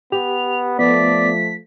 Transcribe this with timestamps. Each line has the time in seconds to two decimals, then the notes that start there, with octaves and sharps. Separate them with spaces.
0.12 B3 G4 F7
0.79 F3 A3 B3 D5 B6